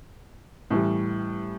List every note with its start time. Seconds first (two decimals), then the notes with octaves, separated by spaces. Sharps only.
0.71 A2 E3 G3